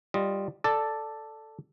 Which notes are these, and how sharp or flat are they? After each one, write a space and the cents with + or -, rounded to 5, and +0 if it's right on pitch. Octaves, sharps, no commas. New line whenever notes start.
G3 +0 F4 +0 D#5 +0
A4 +0 D5 +5